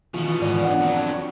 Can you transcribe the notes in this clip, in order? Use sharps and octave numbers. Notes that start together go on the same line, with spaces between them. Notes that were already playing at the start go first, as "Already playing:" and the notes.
B2 D#3 E3 C#4 F4
G#2 D5
D4 D5 F#5
F2 F#3
C#6